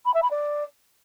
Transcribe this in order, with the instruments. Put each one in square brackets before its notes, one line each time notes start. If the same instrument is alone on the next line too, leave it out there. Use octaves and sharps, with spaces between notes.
[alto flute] B5
E5
B5
D5